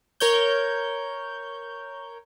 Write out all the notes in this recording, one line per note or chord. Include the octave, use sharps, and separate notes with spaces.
A#4 C#5 G6